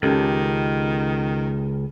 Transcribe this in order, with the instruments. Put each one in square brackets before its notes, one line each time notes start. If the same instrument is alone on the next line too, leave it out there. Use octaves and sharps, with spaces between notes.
[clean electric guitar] C#2 [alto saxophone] D#3 [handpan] C#4 G4 A4